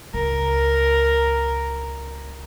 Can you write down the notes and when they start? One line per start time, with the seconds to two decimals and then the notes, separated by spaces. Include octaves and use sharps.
0.14 C#2 A#4